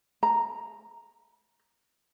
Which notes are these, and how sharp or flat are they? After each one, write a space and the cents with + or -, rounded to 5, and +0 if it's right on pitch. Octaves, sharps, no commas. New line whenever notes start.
A#5 -5